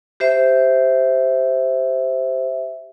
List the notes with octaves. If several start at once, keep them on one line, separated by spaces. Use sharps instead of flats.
G4 C5 E5